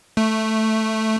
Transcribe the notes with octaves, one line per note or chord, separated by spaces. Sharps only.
A3